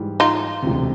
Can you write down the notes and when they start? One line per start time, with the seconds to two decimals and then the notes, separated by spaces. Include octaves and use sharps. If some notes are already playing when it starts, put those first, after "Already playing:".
Already playing: G#2 E3 G3
0.20 D#4 F4
0.62 E1 D2 C3